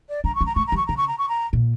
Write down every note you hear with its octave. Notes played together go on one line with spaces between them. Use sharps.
D5
D4 A#5
C#6
C#4
A#5
A3 C#6
A#5
G3
C#6
C#3 A#5
C#6
A#5
C#6
A#5
A#2